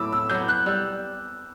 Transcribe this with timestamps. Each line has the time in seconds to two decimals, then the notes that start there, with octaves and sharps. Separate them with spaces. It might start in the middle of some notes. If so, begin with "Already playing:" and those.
Already playing: A2 F#3 B3 B5 D6 E6
0.13 E6
0.30 F#3 B3 G6
0.48 F#6
0.66 G3 E6